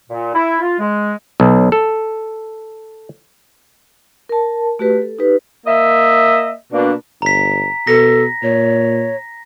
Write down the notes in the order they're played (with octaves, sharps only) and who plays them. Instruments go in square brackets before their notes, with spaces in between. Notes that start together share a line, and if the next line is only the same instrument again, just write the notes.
[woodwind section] A#2
E4
F4
G#3
[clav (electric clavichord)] B1
A4
[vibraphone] A#4 A5
A3 F#4 G4 B4
A4
D#4 G4 B4
[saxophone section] A#3 D#5 E5
B2 A#3 D4
[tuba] G1 [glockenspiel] A#5 B6
[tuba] B2 [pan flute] A4 [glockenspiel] A#6
[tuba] A#2 [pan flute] C#5